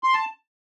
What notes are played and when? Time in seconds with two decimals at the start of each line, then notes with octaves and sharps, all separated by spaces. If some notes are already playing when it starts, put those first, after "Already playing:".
0.04 C6
0.14 A5